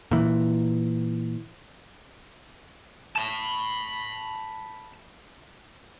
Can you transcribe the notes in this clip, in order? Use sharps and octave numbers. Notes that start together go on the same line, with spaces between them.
A#2 E3
A5 B5